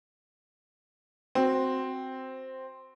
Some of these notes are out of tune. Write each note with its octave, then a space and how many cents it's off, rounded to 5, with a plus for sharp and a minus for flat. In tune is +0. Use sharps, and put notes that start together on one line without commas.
C4 +0 F#4 +0